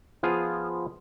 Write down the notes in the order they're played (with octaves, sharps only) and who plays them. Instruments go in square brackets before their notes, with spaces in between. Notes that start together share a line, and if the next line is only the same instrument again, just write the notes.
[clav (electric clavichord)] F3 B3 F4 G#4